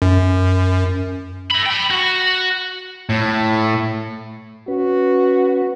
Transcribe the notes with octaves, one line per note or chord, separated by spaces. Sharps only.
F#2
A4 B5
G5 B5
F#4
A2
C#4 F#4 B4